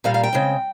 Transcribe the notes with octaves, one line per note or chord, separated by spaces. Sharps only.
A#2 G3 A#3 F5
F5
G5
C#3 G#3 C4